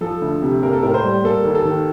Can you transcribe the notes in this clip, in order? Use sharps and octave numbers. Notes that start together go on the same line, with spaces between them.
F3 A4
D2
C3
A#3 A#4
A4
A2 A#4
C5
G3
A#3 A4
D#2
A4
D#3